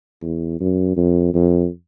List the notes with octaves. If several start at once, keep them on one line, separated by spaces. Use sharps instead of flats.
E2
F#2
F2
F2